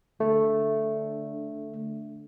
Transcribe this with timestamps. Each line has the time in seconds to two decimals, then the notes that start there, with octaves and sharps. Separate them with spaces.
0.20 D3 A3